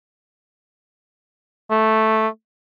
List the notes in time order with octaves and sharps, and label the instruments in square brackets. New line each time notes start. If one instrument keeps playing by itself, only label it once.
[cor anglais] A3